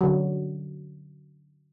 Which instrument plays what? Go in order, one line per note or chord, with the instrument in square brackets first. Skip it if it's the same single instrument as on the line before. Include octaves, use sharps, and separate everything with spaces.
[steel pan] D3 F#3